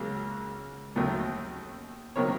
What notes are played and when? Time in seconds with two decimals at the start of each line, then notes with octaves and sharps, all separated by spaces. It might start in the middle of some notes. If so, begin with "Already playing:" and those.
Already playing: C#2 C#3 F#3 A#3
0.96 D#2 D#3 F#3 A3
2.16 C3 D#3 F#3 A#3 C#5